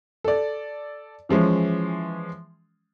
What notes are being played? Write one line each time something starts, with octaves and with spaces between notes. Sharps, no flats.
A4 D5
E3 F3 G#3 C#4